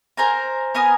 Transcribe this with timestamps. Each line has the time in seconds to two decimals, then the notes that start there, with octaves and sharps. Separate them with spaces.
0.17 A#4 C5 G#5 A#5
0.75 B3 A#4 G#5 D#6